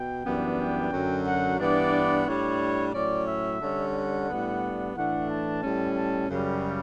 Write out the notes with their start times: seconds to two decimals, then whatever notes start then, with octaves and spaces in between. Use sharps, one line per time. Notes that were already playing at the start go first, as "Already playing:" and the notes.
Already playing: B2 G5
0.25 F#2 E3 G3 B3 D4
0.59 G5
0.92 F#2 D3 F#3
1.26 F#5
1.59 G2 E3 B3 D4 D5
2.26 A2 G3 D4 C#5
2.94 A2 F#3 C#4 D5
3.27 E5
3.61 D3 G3 C#4
3.94 F#5
4.28 A2 G3 B3 D4
4.95 A2 E3 A3 D4 F#5
5.28 A5
5.62 A2 G3 C#4
5.95 A5
6.29 F#2 C#3 G3